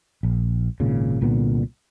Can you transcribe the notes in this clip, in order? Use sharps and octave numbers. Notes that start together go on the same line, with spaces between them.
A#1
G#1 A#2 C#3
C2 A#2 D3 B3